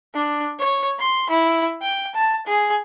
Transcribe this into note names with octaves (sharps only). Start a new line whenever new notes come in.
D4
C#5
C6
E4
G5
A5
G#4